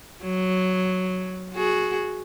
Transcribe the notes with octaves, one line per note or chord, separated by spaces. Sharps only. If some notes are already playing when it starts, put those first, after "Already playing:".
F#3
F#4 G#4